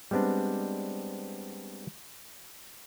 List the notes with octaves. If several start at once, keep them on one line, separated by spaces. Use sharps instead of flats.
G3 G#3 B3 C4 D4